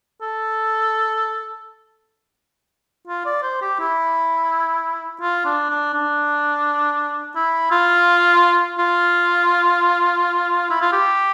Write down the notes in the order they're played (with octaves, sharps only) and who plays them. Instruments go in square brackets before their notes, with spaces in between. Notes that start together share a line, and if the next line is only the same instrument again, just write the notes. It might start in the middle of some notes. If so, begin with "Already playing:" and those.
[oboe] A4
F4
D5
C5
G4
E4
F4
D4
D4
D4
E4
F4
F4
E4
F4
G4